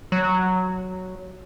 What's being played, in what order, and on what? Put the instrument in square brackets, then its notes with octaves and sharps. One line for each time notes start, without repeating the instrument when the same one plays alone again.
[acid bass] F#3